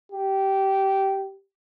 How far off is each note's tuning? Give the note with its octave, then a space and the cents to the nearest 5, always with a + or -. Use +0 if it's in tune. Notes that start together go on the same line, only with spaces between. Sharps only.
G4 -15